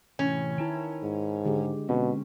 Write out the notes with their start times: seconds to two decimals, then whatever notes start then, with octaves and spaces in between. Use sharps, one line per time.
0.19 A2 C3 E3 C#4
0.58 D#3 E4 G5 A5 A#5
1.03 G#2
1.45 D3 G#3 G4
1.89 B2 D3 G#3 C4 C#4